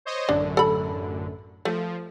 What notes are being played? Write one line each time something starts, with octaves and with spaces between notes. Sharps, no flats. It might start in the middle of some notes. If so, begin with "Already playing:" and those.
C5 C#5 D#5
A1 F#2 D3 D4
A4 B5
F3 A3